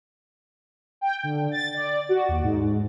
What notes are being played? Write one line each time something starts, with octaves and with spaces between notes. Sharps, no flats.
G5
D3
A6
D5
F#4
D#2
G#2